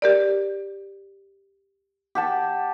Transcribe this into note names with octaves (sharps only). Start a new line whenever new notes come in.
G4 A#4 D5
G4 F#5 A5